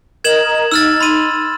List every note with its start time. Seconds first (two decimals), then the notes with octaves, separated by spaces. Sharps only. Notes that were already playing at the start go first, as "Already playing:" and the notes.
0.24 A#4 D#5 G#6 E7 F#7
0.72 D#4 E6 F6 A6
1.00 B5 C6 D#7